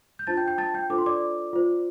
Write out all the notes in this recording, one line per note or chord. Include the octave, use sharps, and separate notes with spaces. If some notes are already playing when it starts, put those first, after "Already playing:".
G6
D4 F4 C5 A5 A6
G5 G6
G5 G6
A5 A6
G5 G6
D4 F4 A4 C5 D6
C6
D5 D6
F4 C5